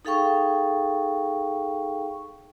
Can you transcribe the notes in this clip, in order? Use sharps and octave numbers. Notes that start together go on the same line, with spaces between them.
D#4 G#4 A4 F5 G5 C#6